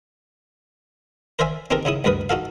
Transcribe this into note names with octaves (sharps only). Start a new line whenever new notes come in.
A#4 C5 D5 E5 G#5
C4 D#4 G4 A4 A#4
C#3 D#4 E4 D#6
D2 G2 A#4 B4 D#6
D#4 F#4 A4 F5